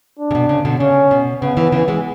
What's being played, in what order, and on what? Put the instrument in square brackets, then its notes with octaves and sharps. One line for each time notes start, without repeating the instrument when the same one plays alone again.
[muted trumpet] D4
[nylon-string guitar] C#3
B2
C#3
B2 D3
[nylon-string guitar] C#3 [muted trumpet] C#4
[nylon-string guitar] B2
[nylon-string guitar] C#3 [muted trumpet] B3
[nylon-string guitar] C#3 E3
C#3 E3
E3 G#3